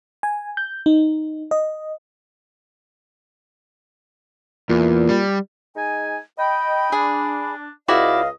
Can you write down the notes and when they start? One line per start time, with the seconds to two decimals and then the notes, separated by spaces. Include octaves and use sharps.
0.23 G#5
0.57 G6
0.86 D#4
1.51 D#5
4.69 E2 A#2
5.09 G3
5.76 G#3 D#4 G#5
6.39 D#5 G5 B5
6.92 D4 G#4
7.88 C#2 E4 F#4 D5 D#5 F5